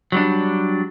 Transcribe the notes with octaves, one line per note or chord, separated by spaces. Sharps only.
F#3 G3 D4